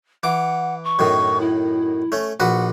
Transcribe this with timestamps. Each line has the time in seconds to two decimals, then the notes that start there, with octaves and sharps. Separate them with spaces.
0.23 E3 F#5 D6
0.84 C#6
0.99 F#2 A2 D#3
1.40 E4
2.12 A3 C#4
2.40 A#1 F#4 B4 F#5